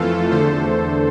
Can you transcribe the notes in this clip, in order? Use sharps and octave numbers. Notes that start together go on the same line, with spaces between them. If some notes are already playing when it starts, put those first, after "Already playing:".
Already playing: F2 E3 A3 F4 A4
E2 D3 A3 A4 C5